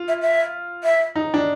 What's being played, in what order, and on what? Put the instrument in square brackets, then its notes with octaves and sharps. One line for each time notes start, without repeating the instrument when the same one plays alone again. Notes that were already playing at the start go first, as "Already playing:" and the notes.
Already playing: [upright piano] F4
[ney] E5
E5
E5
[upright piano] D#4
D4